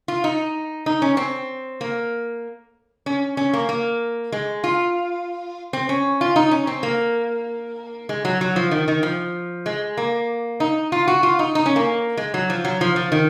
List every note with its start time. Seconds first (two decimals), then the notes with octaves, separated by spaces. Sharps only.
0.08 F4
0.24 D#4
0.86 D#4
1.02 C#4
1.17 C4
1.81 A#3
3.06 C#4
3.37 C#4
3.53 A#3
3.69 A#3
4.32 G#3
4.64 F4
5.73 C4
5.89 C#4
6.21 F4
6.36 D#4
6.51 C#4
6.67 C4
6.83 A#3
8.09 G#3
8.25 F#3
8.41 F#3
8.56 F3
8.71 D#3
8.88 D#3
9.03 F3
9.66 G#3
9.97 A#3
10.60 D#4
10.92 F4
11.08 F#4
11.23 F4
11.39 D#4
11.55 D#4
11.66 C#4
11.76 A#3
12.17 G#3
12.34 F#3
12.50 F3
12.65 F#3
12.81 F3
12.96 F3
13.12 D#3